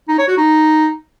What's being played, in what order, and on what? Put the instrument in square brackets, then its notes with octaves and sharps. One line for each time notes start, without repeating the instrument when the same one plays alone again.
[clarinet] D#4
C#5
F#4
D#4